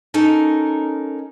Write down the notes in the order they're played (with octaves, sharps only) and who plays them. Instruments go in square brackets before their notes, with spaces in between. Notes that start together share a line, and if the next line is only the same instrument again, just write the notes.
[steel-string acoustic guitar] C#4 D#4 A4 A#4